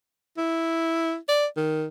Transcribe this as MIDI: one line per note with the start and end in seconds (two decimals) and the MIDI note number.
0.38 1.16 64
1.29 1.46 74
1.57 1.87 51